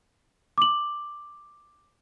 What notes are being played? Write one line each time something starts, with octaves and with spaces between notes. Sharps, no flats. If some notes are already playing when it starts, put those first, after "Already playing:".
D6 F#7